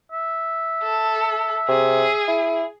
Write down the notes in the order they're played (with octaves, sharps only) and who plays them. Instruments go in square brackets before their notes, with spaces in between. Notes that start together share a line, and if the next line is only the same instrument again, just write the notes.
[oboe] E5
[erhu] A4
[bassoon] C3 [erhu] G#4
[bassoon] E4